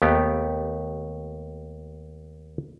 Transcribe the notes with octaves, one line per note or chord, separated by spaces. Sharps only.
D#2 A3 B3 G4